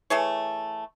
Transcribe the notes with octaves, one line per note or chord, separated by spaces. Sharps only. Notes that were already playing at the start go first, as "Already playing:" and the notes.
E3 A3 G#4 C#5